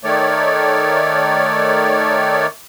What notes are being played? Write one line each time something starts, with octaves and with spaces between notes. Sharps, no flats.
D#3 A3 C#5 D5